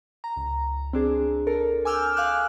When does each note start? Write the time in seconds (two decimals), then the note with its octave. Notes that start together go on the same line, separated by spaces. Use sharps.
0.24 A#5
0.36 C#2
0.93 C4 D4 G#4
1.47 A4 A#4
1.85 G#5 D6 E6 F6 G6
2.17 F5 G#5 D6 F6 F#6